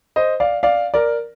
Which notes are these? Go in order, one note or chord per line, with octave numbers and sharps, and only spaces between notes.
C5 D#5
D5 F5
D5 F5
A#4 D5